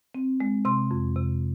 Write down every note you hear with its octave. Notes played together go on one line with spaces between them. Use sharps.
C4
G#3
C3 C6
F2
C3